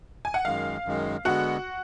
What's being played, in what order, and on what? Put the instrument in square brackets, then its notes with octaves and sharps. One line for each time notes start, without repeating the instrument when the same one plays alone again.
[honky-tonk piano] G#5
F#5
[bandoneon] F#2 D#3 G#3 [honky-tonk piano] F5
[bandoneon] F#2 D#3 G#3
[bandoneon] D3 G#3 B3 [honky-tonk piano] F#4 F#5